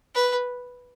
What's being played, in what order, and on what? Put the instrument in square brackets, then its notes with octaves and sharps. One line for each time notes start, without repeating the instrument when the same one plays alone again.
[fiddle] B4